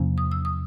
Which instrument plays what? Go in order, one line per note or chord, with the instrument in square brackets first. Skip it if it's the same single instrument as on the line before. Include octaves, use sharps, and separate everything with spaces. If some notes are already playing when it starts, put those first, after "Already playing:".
Already playing: [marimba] E2 C3 F3 A#3 C#4
D#6
E6
D#6